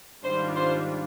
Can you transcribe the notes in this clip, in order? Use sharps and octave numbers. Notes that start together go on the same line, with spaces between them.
G#2 D#3 G3 D4 F4 C5
C5